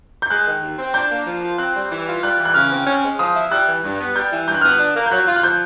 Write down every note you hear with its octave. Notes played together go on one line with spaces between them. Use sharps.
G6
G#3 F#6
D#3
D#2
C4
D4 G6
A#3
F3
F4
C4 F#6
G3
E3
F4
G3 F#6
E3
F#6
C#3 F6
C4
C#4
G#3
F3 D#6
E4
G3 F#6
E3
G2
B3
G3 G6
E3
G2 G6
F#6
B3 F6
F#6
D4
A#3
G6
F#3 F#6
F4
F#6
F3 G6